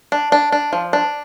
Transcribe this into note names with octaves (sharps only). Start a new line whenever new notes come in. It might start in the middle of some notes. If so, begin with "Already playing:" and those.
D4
D4
D4
F3
D4